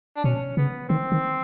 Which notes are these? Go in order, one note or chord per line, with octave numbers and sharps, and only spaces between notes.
D4
B2 C#4
C#3 B3
D#3 C4
D#3